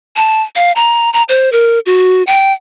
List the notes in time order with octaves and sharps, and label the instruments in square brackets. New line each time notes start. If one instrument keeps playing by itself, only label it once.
[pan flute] A5
F5
A#5
A#5
C5
A#4
F#4
G5